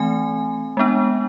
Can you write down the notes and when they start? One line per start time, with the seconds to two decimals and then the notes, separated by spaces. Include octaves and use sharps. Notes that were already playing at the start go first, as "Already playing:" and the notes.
Already playing: E3 A3 C4 G#5
0.77 G#3 B3 D4